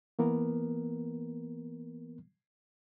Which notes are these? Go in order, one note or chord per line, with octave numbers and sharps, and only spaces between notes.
E3 A#3 B3 A#4